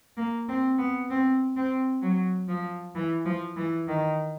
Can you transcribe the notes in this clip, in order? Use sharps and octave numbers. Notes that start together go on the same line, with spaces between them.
A#3
C4
B3
C4
C4
F#3
F3
E3
F3
E3
D#3